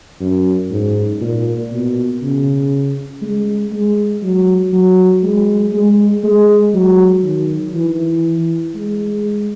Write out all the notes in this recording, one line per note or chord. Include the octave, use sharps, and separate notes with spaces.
F#2
G#2
A#2
B2
C#3
G#3
G#3
F#3
F#3
G#3
G#3
G#3
F#3
D#3
E3
G#3